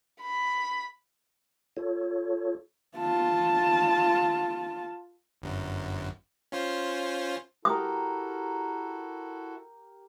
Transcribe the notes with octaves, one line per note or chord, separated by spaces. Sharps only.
B5
F4 A4 C#5
F4 A5
G1 F#2
C#4 F4 C5
E4 F#4 G4 A4 A#4 D#6